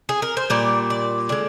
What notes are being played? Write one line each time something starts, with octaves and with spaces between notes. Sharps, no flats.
G#4
A#4
C5
A#2 G3 D5
D5
D3 G#3 D5